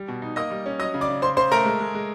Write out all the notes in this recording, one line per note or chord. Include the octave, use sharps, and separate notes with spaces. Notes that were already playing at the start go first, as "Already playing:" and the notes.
Already playing: G3
B2
D#4
A#3 D#5 D#6
G3
C#4
F#3 D#5 D#6
C#3
D5 D6
C#3
C#3 C5 C6
C#3 C5 C6
A3 A#4 A#5
G#3
G#3
G#3